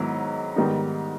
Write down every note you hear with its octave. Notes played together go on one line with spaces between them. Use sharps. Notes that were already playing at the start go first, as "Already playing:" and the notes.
Already playing: G#2 D#3 F#3 B3 E4
G#2 D#3 G3 B3 D#4